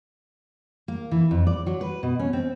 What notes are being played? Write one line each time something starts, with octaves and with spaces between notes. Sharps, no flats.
A#3
E3
F2
D5
F#3
B4
B2
C#4
C4